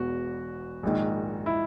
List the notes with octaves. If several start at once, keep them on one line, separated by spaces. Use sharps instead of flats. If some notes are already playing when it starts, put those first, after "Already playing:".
Already playing: E1 E2 B2 F#4
A#1 G#2 D#3
E4